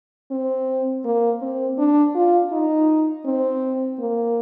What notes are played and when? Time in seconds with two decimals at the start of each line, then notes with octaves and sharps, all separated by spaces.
0.31 C4
1.05 A#3
1.42 C4
1.78 D4
2.15 F4
2.52 D#4
3.26 C4
3.99 A#3